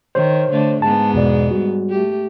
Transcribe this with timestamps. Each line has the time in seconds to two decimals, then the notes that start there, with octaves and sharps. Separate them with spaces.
0.15 D#3 C5 C#5
0.51 D3 A3
0.82 G#2 G#3 B3 A5
1.14 E2 B2 D5
1.51 G3 F#4
1.89 A3 G4